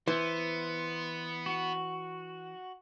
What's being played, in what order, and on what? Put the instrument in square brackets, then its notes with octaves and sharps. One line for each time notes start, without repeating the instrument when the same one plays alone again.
[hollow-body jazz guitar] E3 [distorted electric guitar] B3 [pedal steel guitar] C5
[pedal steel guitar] F#4